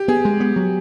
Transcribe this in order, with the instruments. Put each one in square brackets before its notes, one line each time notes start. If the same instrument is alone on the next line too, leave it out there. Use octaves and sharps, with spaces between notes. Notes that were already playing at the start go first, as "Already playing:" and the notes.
Already playing: [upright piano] G4
[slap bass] B3 [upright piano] G#4
[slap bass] G#3
B3
F#3